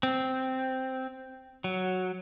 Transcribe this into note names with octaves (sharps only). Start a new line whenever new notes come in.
C4
F#3